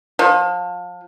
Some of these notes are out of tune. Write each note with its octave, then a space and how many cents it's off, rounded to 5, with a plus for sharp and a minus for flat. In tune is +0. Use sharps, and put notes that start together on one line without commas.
F3 +30